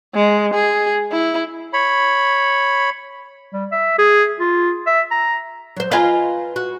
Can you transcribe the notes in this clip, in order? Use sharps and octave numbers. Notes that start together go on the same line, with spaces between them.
G#3
G#4
E4
C#5 B5
G3
E5
G#4
F4
E5
A#5
F#3 C5
F4 B4 D#5 F5 G#5 A#5
F#4